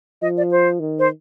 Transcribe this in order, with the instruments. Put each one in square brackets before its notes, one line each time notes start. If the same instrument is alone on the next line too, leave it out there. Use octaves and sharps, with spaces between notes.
[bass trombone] F3 [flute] D#5
[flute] D5
C5
[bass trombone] D#3
[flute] C5